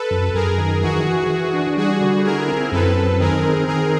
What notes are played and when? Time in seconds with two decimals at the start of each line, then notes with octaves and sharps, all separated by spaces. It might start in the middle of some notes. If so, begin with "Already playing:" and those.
Already playing: A4 B4
0.11 F#2
0.34 F#2 G#4 A#4
0.58 D#3
0.82 E3 F#4 G#4
1.07 E3
1.30 E3
1.53 D4
1.77 G3 F#4 G#4
2.01 D3
2.25 E4 G#4 A#4
2.48 C4
2.72 F#2 A4 B4
2.96 C4
3.20 D#3 G#4 A#4
3.43 C4
3.67 D#3 G#4 A#4